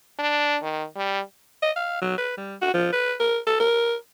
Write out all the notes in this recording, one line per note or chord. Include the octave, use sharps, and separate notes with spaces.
D4
D#3
G3
D#5
F5
F#3
B4
G3
F#4
F3
B4
A#4
A4
A#4